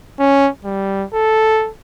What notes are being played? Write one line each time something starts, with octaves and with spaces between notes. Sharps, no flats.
C#4
G3
A4